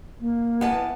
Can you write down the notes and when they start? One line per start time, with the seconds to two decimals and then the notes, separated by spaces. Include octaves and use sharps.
0.20 A#3
0.61 F2 E3 B3 A5